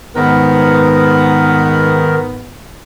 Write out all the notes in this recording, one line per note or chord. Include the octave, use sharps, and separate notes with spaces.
G#2 D#3 B3 A#4